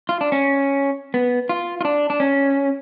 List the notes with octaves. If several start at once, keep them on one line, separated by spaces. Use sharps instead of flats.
F4
D4
C#4
B3
F4
F4
D4
D4
C#4